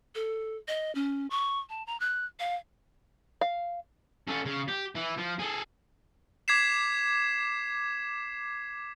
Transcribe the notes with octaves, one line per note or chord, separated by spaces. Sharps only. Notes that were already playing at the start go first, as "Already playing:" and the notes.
A4
D#5
C#4
C#6
A5
A#5
F#6
F5
F5
C#4 A4
C#3
G4
E3
F3
G#4 A4
D6 G#6 B6 C7 E7